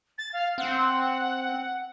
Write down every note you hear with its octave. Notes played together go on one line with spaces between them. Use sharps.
A6
F5
C4 F#5